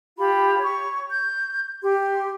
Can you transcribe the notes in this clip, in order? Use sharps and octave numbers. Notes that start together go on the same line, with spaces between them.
F4 G4 B5
C#5 C#6
G6
G4 C6